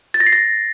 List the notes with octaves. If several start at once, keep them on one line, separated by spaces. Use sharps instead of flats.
A6
A#6
C7
A#6